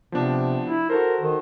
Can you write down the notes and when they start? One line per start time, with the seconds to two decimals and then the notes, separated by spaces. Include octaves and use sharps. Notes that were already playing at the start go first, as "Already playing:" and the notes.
0.12 C3 F3 B3 D4
0.64 E4
0.90 F#4 A4 A#4 C5
1.21 D#3